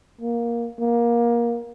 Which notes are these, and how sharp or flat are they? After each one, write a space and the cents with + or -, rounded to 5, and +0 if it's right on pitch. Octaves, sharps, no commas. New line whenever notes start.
A#3 +10
A#3 +20